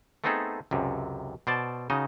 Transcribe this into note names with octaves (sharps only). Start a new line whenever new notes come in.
A3 B3 C4 D#4 G#4 A4
C#2 F#2 C3
B2 C5 D5 A5
C#3 D#4 F#4 D#5